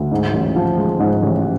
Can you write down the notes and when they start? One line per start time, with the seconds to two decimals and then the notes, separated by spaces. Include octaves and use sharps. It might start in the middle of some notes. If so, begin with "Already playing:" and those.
Already playing: D2
0.11 G#2
0.33 A1
0.56 F3
0.78 G#3
0.99 G#2
1.22 A1